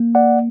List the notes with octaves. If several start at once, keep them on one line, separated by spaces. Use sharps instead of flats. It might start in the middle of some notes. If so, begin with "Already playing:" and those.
Already playing: A#3
D5 F#5